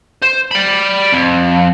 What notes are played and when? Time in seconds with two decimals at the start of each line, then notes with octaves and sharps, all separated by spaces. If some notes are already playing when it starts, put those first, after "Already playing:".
0.22 C5
0.51 D5 B5
1.13 F2